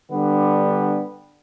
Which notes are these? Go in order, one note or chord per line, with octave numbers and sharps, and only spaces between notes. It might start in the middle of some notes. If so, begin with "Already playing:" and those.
D3 G3 B3 D4